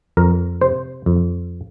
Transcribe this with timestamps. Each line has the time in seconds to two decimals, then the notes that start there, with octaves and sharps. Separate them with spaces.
0.17 F2 A#4
0.61 C3 C5
1.06 F2